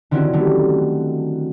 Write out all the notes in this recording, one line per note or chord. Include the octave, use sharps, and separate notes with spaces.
D3 D#3 C4 C#4 E4 F#4
D3 D#3 F#3 G3 A3